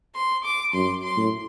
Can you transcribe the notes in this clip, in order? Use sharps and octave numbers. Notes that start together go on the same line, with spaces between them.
C6
D6
F#2 C6
C6
A2